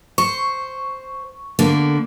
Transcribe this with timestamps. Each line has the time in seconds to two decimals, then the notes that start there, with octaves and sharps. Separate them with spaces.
0.18 C5 C#6
1.59 D3 A#3 B3